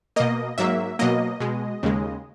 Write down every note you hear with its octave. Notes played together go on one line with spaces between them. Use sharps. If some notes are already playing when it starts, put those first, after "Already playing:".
B2 A#3 D#5
G#2 F#3 A#3 E5
B2 F#3 A#3 D#5
B2 G#3
D#2 C#3 G#3